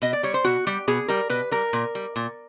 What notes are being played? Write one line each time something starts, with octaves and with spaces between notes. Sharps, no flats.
B2 D#5
D5
G3 C#5
C5
B2 F#4
G3 G4
B2 G#4
G3 A#4
B2 B4
G3 A#4
A#2
G3
A#2